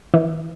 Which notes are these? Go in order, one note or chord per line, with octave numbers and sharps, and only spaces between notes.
E3